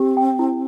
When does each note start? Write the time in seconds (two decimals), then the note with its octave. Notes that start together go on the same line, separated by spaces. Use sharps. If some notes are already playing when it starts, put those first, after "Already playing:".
Already playing: C4 G4
0.17 G5
0.39 E4